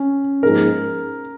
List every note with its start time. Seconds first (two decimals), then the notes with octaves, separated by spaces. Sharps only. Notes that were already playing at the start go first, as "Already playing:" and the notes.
Already playing: C#4
0.43 G#2 F3 A#3 D#4 G#4 A#4